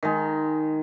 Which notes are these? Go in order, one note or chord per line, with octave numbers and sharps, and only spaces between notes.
D#3 G#3